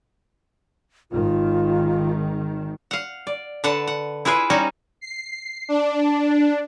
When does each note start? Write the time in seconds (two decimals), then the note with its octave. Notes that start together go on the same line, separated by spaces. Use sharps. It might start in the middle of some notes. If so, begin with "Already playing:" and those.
1.11 G#1 D#3 F4
2.91 F5 F#5
3.27 D5
3.64 D3 B4 F#5 A5
3.87 F#5
4.25 E4 F4 G#4 B4 E5
4.50 G3 C#4 D#4 F#4
5.01 C7
5.69 D4